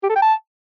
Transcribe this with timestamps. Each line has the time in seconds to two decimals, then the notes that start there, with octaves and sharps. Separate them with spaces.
0.03 G4
0.09 A4
0.16 G5
0.22 A5